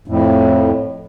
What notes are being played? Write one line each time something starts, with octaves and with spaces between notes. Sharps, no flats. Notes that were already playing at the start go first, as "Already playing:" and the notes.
F2 A2